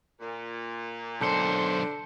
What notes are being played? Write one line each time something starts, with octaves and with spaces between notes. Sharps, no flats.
A#2
B1 D3 C5 A5 G6 C#7